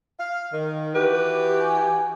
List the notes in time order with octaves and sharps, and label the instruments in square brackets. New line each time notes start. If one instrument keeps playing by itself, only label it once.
[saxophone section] F5
D#3
[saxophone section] E3 F#4 G4 [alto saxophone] B4
[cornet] G#5